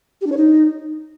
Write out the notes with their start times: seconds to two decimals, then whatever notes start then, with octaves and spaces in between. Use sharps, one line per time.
0.21 G4
0.26 D4
0.32 C#5
0.37 D#4